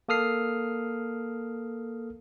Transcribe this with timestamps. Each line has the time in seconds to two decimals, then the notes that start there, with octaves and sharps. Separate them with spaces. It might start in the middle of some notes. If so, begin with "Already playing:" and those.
0.08 A#3 A4 D#6 F6 C7